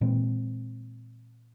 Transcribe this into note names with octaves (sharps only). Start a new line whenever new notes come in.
A#2 E3 G#3 C4